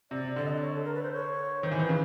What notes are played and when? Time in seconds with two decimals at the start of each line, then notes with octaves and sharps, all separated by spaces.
0.11 C3 D5
0.36 D3 D5
0.45 D#5
0.53 D5
0.61 C#5
0.75 A4
0.85 A#4
0.94 B4
1.03 C5
1.13 C#5
1.63 D#3 C5
1.71 E3
1.79 D#3 B4
1.89 C#3